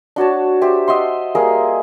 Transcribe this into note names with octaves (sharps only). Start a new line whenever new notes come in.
D4 F#4 C#5 A5
G4 C5 E5
D#5 E5 F#5 C6
G3 A#3 G#4 A#4